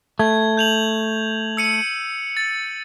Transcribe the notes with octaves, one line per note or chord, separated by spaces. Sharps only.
A3 G#6
G6 F7 F#7
E6 C#7 D#7
A6